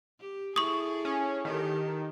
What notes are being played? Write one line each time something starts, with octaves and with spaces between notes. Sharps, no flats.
G4
E4 G#4 A4 C#6 D#6
C#4
D#3 G4 A4